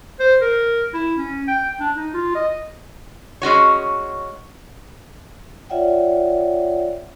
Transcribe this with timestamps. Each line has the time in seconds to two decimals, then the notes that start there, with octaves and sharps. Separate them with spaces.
0.20 C5
0.41 A#4
0.94 E4
1.17 C#4
1.48 G5
1.80 D4
1.96 D#4
2.14 F4
2.35 D#5
3.42 G#3 C#4 F#4 C#5
5.70 F4 C#5 D5 E5 F#5 G5